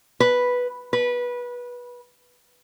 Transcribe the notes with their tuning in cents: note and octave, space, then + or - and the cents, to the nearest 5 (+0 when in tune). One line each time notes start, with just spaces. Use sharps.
B4 -5
B4 -20